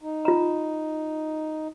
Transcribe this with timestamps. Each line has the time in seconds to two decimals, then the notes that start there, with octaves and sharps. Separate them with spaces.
0.01 D#4
0.25 F4 A#5